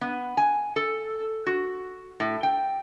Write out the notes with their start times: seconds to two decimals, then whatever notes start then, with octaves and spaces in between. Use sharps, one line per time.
0.01 B3
0.37 G#5
0.76 A4
1.47 F#4
2.20 A2
2.43 G5